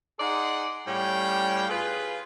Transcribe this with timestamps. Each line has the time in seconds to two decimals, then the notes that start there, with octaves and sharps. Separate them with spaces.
0.19 D#4 G#4 D5 F#5 C6
0.87 A2 G3 C#4 F5 G5
1.70 F4 G#4 B4